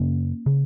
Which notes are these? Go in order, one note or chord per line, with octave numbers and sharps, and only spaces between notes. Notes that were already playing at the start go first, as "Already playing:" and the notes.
Already playing: F#2 C#3 A#3 C#4
C#3